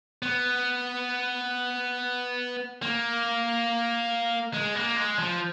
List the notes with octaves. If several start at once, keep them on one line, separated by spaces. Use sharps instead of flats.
B3
A#3
G#3
A#3
G#3
F3